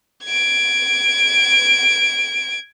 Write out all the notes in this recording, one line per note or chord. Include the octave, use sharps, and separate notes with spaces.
G#6 D7